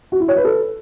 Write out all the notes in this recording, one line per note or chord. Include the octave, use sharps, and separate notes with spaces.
F#4
E4
C#5
B4
A4